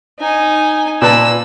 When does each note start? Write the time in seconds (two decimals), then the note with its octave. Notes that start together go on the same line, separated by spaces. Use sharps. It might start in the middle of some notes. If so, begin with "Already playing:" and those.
0.20 D#4 G#5
1.02 A#2 B4 A5 E6